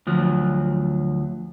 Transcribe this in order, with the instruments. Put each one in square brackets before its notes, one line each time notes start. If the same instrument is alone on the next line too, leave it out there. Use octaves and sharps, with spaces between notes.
[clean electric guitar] D2 F3 F#3